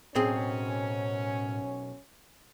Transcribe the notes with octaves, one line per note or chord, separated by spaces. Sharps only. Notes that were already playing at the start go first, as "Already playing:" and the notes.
B1 F#2 A2 F#3 C4 C#4 G#4